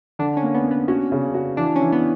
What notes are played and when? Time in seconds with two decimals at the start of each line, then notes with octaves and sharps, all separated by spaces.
0.19 D3 D4
0.37 C#4
0.43 A#3
0.55 B3
0.65 A#3
0.71 B3
0.88 C#4 F#4
1.12 C#3
1.34 F#4
1.57 E3 D4
1.76 C#4
1.81 E3
1.92 B3